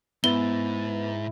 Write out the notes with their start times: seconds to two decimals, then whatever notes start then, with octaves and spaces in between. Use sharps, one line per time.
0.24 D#2 G#2 B3 E4 B4 A6 G7